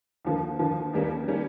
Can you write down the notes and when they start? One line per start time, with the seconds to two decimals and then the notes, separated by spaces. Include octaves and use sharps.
0.25 D#2 D3 F3 A#3
0.59 D#2 D3 F3 A#3
0.93 D#2 D#3 G3 A#3 C#4
1.28 D#3 G3 A#3 C#4